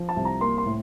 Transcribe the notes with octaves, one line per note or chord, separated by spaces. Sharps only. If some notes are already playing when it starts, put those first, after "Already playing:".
Already playing: F3
A5
C2
A#5
A#3 C6
C6
A2